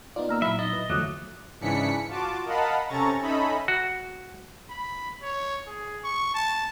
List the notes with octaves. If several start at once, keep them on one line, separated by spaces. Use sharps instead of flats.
B3 D#4 F4 D5
A#3 A#5 E6 F6
A#2 F#3 E4 E5 B5
D#4 E4 D#5 A6 G7
B4
E2 D3 F3 F#3 A3 D6 D#6 F#6
G#2 C#3 E3 D4 B6 C#7
F4 F#4 A5 D6
A#4 D#5 F5 F#5 A5 B5
C3 C#4 A4 A#5 C#6 A6
C#4 D#4 A4 D#5 E5 B5
F#4
B5
C#5
G#4
C#6
A5